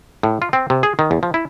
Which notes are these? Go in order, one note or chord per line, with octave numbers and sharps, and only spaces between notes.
A2
F4
C4
C3
G#4
D#3
E2
F3
E4